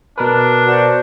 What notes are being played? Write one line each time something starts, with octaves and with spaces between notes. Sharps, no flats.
B2 D4 A#4 B4
F#4 C5 D5